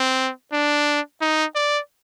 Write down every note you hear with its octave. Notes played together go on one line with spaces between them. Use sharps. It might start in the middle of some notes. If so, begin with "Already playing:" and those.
Already playing: C4
D4
D#4
D5